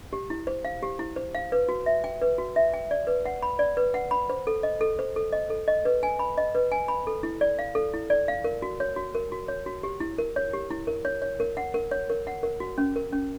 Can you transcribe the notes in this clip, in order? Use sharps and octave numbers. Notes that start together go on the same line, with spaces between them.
G4
E4
C5
F5
G4
E4
C5
F5
B4
F#4
E5
G5
B4
F#4
E5
G5
D5
B4
F#5
B5
D5
B4
F#5
B5
C5
A4
D#5
A4
C5
A4
D#5
A4
D#5
B4
G#5
B5
D#5
B4
G#5
B5
A4
E4
D5
F5
A4
E4
D5
F5
A#4
F#4
C#5
F#4
A#4
F#4
C#5
F#4
G4
E4
A#4
C#5
G4
E4
A#4
C#5
C#5
A#4
F#5
A#4
C#5
A#4
F#5
A#4
F#4
C#4
A#4
C#4